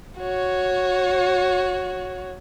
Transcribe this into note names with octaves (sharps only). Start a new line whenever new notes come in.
F#4 C#5